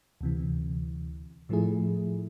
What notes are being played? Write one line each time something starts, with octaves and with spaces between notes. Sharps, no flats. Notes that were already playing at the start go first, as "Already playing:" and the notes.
D2 C3 E3
A2 F3 A3 E4 G#4